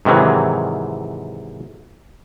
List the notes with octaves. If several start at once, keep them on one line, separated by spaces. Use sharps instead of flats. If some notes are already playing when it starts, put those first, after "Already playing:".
G#2 C3 D#3 E3 F#3